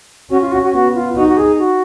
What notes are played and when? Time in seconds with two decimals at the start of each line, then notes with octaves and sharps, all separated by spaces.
0.30 C#4 F#4
0.41 F4
0.52 F#4
0.62 F#4
0.73 B3 F#4
0.95 F4
1.16 D#4 F#4
1.28 F#4
1.37 G#4
1.58 F#4